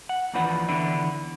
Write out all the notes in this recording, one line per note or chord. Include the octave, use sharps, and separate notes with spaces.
F#5
D#2 E3 F3 D4 B4 F#5
D3 E3 B3 D4 E4